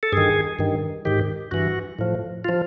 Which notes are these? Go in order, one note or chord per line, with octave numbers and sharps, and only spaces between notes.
A4
G2 D#3 G#4
G2 D#3
G#2 D#3 G4
G2 E3 F#4
A2 F3
F4
F3